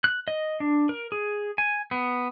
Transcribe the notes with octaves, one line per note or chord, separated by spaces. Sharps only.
F#6
D#5
D4
A#4
G#4
G#5
B3